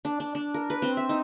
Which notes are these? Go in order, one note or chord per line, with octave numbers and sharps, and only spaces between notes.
D4
D4
D4
A#4
B4
C4
E5
D#4